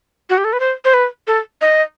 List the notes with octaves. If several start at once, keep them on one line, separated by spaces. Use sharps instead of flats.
F#4
G4
A4
B4
C5
C5
B4
A4
D#5